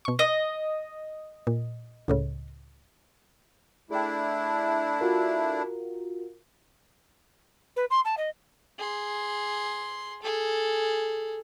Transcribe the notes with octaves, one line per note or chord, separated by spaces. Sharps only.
B2 C#6
D#5 D#7
A#2
C#2 A2 C#3
A3 D4 E4 G#4 G5
F4 F#4 A#4
B4
C6
A5
D#5
G#4 C6
G#4 A4